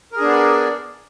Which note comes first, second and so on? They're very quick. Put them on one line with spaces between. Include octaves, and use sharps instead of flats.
A#4 G#4 D4 B3 D5